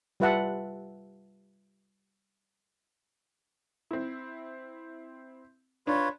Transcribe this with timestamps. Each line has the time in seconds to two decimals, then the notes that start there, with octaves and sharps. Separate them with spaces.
0.20 G3 F4 B4 E5 F#5 A5
3.91 C4 E4
5.87 D4 F4 B4 C#5